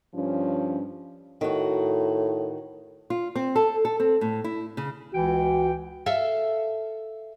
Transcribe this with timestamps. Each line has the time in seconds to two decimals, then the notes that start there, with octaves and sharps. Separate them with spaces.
0.15 G2 F3 C#4
1.41 A2 D#3 F#4
3.10 F4
3.36 C4
3.56 A4
3.85 A4
4.00 C4
4.21 A2
4.44 E4
4.77 C#3
5.14 C#2 E3 F#4 G5
6.06 A4 E5 F5